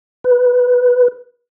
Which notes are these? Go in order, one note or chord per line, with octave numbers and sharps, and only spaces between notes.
B4